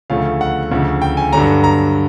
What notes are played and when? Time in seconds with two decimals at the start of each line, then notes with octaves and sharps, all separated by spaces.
0.10 D2 C#3 F3 A3 C#4 F5
0.41 F#5
0.71 D2 C#3 F3 A3
1.02 G5
1.17 G#5
1.33 G2 D3 F#3 A#5
1.64 A#5